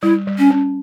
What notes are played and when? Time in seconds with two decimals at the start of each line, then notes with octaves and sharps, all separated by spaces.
0.02 G3 E4
0.27 G3
0.38 C#4
0.51 C#4